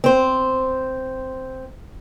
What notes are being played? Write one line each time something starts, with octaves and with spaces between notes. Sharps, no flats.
C4 C5